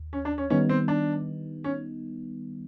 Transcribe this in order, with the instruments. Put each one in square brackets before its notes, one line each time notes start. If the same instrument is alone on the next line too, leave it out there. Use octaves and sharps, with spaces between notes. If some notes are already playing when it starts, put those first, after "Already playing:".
Already playing: [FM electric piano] D#2
[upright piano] C#4
D4
C#4
[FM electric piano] D#3 G3 B3 D#4 [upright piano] C#4
[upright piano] C4
D4
C#4